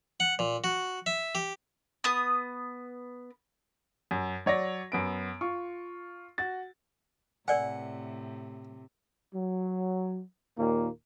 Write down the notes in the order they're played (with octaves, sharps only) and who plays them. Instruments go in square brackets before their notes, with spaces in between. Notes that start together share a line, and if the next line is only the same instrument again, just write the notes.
[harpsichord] F#5
A#2
F#4
E5
G4
[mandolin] B3 D#6
[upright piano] F#2
F#3 C#5 D5 A#6
F#2 B3 D7
F4 C#6
F#4 A6
[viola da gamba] A2 C3 [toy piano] A#4 D5 G#5 [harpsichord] F#5
[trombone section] F#3
D#2 A#2 A#3